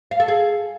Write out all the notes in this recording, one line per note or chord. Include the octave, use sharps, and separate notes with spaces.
F5
A4
G#4